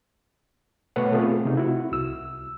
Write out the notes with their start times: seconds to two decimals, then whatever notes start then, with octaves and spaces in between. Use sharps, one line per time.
0.96 B2 A3 B4 C#5 F#5
1.12 A3 B3 C4 F4 G#4 A4
1.45 C3 D#4
1.57 E4 F#4
1.92 C2 E6